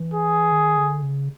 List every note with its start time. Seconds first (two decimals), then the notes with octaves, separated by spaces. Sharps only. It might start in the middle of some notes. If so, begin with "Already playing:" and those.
Already playing: E3
0.14 G#4
0.52 D#3
0.77 D3
1.02 C#3